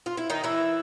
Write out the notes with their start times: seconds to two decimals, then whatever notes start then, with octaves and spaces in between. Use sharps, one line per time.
0.06 F4
0.18 E4
0.30 D#3 D#4
0.44 E3 E4